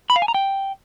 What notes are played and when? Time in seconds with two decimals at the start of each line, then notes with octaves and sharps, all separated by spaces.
0.10 B5
0.16 F5
0.22 G#5
0.28 A#5
0.34 G5